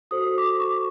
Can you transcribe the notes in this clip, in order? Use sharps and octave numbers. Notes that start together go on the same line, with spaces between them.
F#4 A4 C5 D#6
D6
C#6
D6